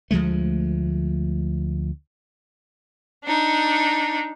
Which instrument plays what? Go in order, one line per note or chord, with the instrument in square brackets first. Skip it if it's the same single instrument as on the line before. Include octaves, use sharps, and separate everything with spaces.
[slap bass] D2 F3 G#3 A3
[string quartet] D4 D#4